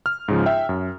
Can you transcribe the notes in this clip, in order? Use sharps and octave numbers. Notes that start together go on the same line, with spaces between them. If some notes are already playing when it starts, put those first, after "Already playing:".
F6
G#2 C#3 F3
E5 G5
F#2